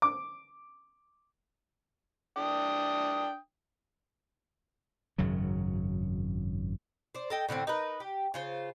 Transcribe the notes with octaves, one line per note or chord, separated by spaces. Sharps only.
D6
D4 G5 D#6
G#1 F#2 C#3 F#3
C5 D5
A4 D#5 G5
A2 D3 A#3 C4
D#4 A#4 B4
G4
C#3 F4 C5